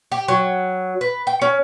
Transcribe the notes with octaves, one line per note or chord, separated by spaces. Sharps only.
G4
F#3
B4
G5
C#4